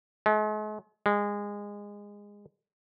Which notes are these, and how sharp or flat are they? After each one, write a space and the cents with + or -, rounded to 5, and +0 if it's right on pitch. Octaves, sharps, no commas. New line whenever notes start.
G#3 +45
G#3 -20